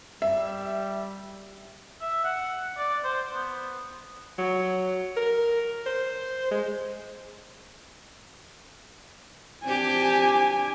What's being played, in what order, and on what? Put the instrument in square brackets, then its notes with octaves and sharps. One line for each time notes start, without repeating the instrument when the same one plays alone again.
[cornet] G3 [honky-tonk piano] E5
[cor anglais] E5
F#5
D5
C5
B3
[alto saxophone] F#3
A#4
C5
G#3
[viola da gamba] C4 D4 G4 [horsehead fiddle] G#5